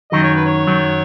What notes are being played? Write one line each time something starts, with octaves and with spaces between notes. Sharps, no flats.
F#2 D#3 F#3 D#5
C#5
B4
C#5
F#2 D#3 F#3